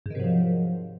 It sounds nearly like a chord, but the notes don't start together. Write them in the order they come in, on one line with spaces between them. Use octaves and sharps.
G#2 D#3 C3 F#3 F3